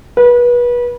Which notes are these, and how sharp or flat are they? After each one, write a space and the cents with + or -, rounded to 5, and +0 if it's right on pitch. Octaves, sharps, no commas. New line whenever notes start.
B4 -30